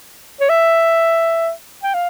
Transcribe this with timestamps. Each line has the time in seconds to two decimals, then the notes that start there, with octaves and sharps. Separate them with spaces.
0.40 C#5
0.49 E5
1.83 G5
1.94 F5